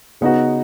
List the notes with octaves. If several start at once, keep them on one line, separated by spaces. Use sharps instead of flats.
C#3 B3 D#4 F#4